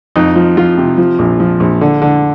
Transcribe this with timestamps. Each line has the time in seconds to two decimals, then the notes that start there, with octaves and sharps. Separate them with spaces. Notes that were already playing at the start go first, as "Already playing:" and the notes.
0.16 F2 D#4
0.36 F3
0.57 F3 F4
0.78 C3
0.98 F3
1.19 A#1
1.40 F3
1.60 A#1
1.81 D3
2.02 D3